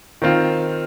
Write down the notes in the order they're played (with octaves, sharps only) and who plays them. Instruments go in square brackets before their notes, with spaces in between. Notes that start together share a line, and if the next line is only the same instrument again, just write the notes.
[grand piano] D#3 C4 F4